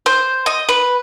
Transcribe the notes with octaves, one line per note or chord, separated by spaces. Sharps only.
C5
D#5
B4